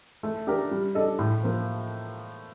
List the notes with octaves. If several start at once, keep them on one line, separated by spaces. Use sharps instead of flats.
A3
D4 G4 A#4
G3
D4 A4 D#5
A2
F3 A#3